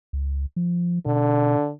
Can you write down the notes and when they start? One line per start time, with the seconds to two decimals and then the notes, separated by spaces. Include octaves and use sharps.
0.13 C#2
0.56 F3
1.06 B2 D3